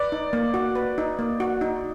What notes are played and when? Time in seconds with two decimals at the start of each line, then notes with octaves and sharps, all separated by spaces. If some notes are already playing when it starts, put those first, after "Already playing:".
Already playing: B4 D5
0.12 D#4
0.33 A#3
0.54 F#4
0.75 B4
0.98 D#4
1.19 A#3
1.40 F#4
1.61 D#4